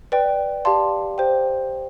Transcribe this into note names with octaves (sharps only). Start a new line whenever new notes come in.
B4 D5 G5
G4 D5 F5 A5 C6
G4 C5 G5